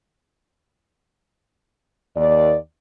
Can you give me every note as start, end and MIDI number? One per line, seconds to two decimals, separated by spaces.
2.17 2.55 39
2.17 2.55 74